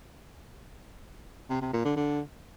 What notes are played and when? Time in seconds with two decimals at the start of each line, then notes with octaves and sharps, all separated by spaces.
1.50 C3
1.61 C3
1.73 A#2
1.85 D3
1.96 D3